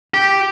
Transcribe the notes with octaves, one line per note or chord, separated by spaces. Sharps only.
G4